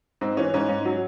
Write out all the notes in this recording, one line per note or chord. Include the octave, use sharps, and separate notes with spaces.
G#2 C4
E3 C#4
G#2 C#4
G#2
F#3